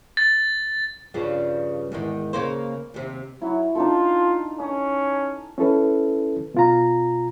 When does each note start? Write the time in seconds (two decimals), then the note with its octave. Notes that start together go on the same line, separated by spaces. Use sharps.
0.17 A6
1.14 G2 C#3 F3
1.92 E2 G#2 D#3
2.33 C#3 A#3 C5
2.94 D#2 C3
3.42 F#3 E4
3.75 D4 D#4 F4 A4
4.59 C#4 D#6
5.58 C#4 E4 A4 B4
6.54 B2 F4 A#5